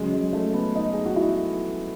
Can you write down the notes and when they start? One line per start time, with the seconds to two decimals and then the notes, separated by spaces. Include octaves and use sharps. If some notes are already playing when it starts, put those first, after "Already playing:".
Already playing: C#3 F#3 G#3
0.12 G#3
0.33 A3
0.54 B3
0.75 D#4
0.93 G#4
1.06 F#4
1.16 E4